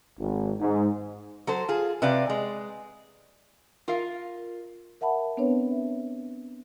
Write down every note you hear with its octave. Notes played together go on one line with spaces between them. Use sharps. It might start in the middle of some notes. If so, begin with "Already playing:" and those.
G#1
G#2
F#3 A4 C5
F4 G#4
C3 B4 D5 F5
G#3
F4 A#4 D#5 F5
A#4 E5 F#5 A5 B5
B3 C4 D4 B4 C#5
E5